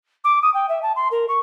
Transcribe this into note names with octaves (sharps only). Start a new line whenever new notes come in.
D6
D#6
G5
E5
A5
C6
A#4
C#6